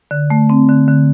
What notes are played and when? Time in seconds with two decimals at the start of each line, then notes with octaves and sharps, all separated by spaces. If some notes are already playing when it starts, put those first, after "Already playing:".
0.11 D3
0.30 A3
0.50 C4
0.69 D3
0.88 D3